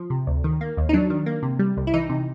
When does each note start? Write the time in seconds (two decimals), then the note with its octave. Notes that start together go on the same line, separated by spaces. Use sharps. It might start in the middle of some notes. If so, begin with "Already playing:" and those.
Already playing: F3
0.10 C3
0.27 D2
0.44 D#3
0.61 A#3
0.77 D#2
0.89 D#4
0.93 F#3 D4
1.10 D#3
1.26 A#3
1.43 C3
1.59 G3
1.77 C2
1.87 E4
1.94 E3 D#4
2.09 C3